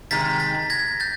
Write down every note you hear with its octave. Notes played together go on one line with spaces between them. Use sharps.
C3 D#3 G#3 A6 B6
A6 B6
G#6 A#6
G6 A6